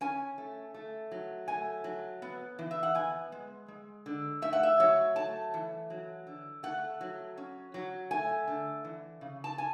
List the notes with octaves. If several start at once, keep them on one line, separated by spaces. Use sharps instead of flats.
C#4 G#5
A3
A3
F#3
A3 G#5
F#3
B3
E3
E5
F#5
B3 G#5
G#3
G#3
D3
A3 E5
F#5
E5
F#3 C#5
A3 A5
E3
F#3
D3
A3 F#5
F#3
C#4
F#3
A3 G#5
D3
E3
C#3
A5
G#5